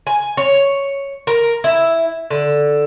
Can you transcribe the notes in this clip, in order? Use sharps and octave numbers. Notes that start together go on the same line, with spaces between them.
G#5
C#5
A#4
E4
D3